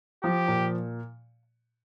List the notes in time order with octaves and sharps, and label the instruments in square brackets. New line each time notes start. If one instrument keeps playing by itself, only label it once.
[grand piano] F3 [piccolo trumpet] G4
[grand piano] A#2